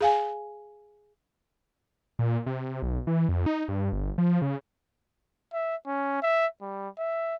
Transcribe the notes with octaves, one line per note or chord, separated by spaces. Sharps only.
G#4 F5 G#5
A#2
C3
B1
E3
F2
D#4
G2
G1
F3
C#3
E5
C#4
E5
G3
E5